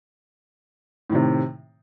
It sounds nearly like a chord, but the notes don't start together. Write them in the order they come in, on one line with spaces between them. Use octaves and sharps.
A2 D#3 C3